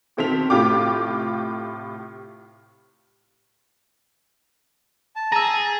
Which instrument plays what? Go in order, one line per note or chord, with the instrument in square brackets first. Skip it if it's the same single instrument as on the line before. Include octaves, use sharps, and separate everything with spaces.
[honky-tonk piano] B2 D#3 C4 A4 B6 F7
A2 C3 F4 G5 D6
[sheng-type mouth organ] A5
[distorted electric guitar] G#4 [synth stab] A#5 E6